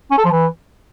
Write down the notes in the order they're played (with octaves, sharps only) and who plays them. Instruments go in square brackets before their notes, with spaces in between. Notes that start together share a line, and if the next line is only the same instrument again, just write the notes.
[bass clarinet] C#4
A4
F3
E3